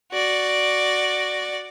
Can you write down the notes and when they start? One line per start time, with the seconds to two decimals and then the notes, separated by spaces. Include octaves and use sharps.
0.12 F#4 D5